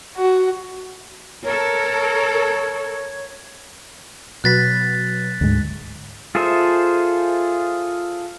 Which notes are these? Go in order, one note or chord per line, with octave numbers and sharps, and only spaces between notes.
F#4
A4 A#4 C#5
B2 F#3 B4 F#6 A6 B6
D2 G#2
F4 G#4 A4 C5 E5